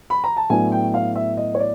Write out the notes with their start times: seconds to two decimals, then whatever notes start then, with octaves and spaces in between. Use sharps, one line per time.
0.10 B5
0.24 A#5
0.37 A5
0.50 A2 F#3 B3 D4 G#5
0.72 G5
0.94 F5
1.16 E5
1.37 D#5
1.55 C#5
1.60 D5